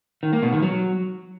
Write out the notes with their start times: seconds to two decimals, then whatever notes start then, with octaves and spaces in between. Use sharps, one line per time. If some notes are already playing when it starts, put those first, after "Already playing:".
0.23 D#3
0.33 A#3
0.43 B2
0.53 D#3
0.63 F#3